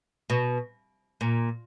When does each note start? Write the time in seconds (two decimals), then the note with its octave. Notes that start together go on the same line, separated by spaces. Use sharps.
0.30 B2
1.21 A#2